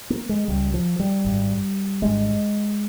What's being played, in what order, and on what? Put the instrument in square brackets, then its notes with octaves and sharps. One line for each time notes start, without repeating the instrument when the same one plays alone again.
[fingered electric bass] A#3
G#3
C#2 C#3 G3
F3
G3
G#1 G2
G#1 G2 G#3